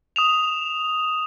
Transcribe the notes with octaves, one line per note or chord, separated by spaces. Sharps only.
D#6 E7 F7